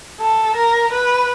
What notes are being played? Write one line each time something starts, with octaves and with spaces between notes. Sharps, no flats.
A4
A#4
B4